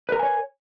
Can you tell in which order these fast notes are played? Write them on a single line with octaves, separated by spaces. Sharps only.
B4 A#4 A#5 G#5 C#5